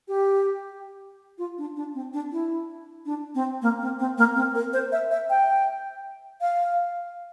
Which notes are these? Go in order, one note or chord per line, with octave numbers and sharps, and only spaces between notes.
G4
F4
D4
D4
C4
D4
E4
D4
C4
A#3
C4
C4
A#3
C4
A#4
C5
E5
E5
G5
F5